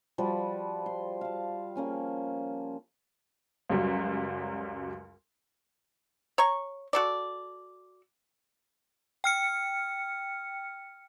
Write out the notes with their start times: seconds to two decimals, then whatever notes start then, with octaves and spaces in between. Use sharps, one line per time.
0.18 F3 G3 F#4 B4
0.86 C6
1.21 F5 A5
1.75 A#3 C#4 G#5
3.70 C#2 F#2 F#3 G3
6.38 C#5 A#5 C#6
6.93 F#4 A4 D5
9.24 G5 F6 C#7